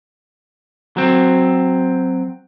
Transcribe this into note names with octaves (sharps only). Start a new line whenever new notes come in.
F#3 C4